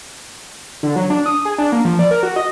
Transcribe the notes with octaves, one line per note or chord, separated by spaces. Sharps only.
D3
F#3
D4
D#6
G#4
D4
A#3
F3
D5
A#4
F#4
D#5